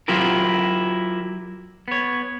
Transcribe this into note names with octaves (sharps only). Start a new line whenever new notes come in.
F#3 E4 F4 G4 A#4
B3 C#5